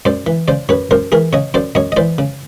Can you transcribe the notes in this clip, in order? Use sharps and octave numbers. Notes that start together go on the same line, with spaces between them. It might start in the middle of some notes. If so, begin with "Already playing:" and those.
F#2 C5 D5
E3
C#3 C5 D5
F#2 B4 C#5
F#2 A#4 C5
E3 G#4 A#4
C#3 C#5 D#5
F#2 C5 D5
F#2 C#5 D#5
D#5
E3 C5 D5
C#3